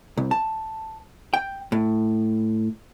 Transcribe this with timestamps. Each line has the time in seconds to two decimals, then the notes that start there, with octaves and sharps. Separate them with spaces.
0.17 C2
0.31 A5
1.34 G5
1.72 A2